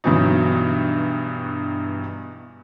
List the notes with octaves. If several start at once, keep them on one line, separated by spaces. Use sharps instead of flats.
G2 B2 E3 F#3 D#4